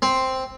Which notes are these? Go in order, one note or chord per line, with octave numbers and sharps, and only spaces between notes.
C4